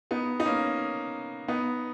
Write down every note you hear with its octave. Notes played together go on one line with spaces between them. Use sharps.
B3 D#4
D#4
A#3 C#4
B3 D#4